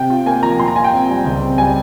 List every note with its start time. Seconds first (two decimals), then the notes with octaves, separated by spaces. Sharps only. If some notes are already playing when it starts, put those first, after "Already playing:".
Already playing: C3 G5
0.10 F4
0.26 A#3 G#5
0.43 F3 A#5
0.59 A#2 C6
0.68 A#5
0.76 F4 G#5
0.84 G5
0.92 C4
1.09 G3
1.25 C#2
1.41 C4
1.58 G3 G#5